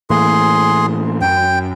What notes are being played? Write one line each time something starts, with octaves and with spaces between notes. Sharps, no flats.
A2 E3 A#3 G#4 C6
F#2 G5